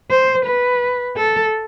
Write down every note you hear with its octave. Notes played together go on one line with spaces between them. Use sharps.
C5
B4
A4